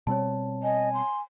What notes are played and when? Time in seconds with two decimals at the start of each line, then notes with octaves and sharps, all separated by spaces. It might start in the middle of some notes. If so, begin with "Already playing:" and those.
0.07 B2 G3 C4 C#5 A5
0.63 D#5 G#5
0.94 C6